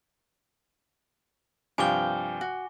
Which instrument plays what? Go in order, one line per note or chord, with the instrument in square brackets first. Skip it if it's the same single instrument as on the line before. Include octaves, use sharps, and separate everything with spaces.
[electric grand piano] G2 C3 F3 [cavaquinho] F5 G5 [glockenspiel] G#5 D6 G7
[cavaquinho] F#4